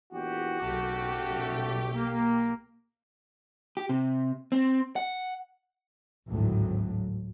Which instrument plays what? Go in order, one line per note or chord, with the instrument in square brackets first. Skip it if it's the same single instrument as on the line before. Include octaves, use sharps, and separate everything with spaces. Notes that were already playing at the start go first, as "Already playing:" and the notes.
[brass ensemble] A#1 E2 G4 [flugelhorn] F#4
[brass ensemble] F#1 F#2 A3 [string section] B1 G4
[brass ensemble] A#3
[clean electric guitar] G4
C3
C4
F#5
[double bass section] G#1 D2 A2 F#3